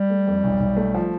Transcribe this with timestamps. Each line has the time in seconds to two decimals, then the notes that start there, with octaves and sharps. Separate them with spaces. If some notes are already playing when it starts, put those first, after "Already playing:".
Already playing: G3
0.10 A3
0.27 F2
0.44 B1
0.60 B1
0.77 A3
0.94 F3